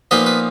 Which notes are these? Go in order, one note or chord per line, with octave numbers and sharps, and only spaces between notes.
A#2 F3 B3 D#4 B4 D#5
B4